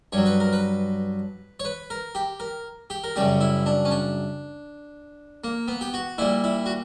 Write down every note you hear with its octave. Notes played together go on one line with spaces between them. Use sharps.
G2 F#3 C#5
B4
A#4
B4
C#5
B4
A#4
G4
A#4
G4
A#4
F#2 C#3 G3 G4
E4
D4
C#4
D4
A#3
B3
G4
F#4
A#2 G3 E4
E4
F#4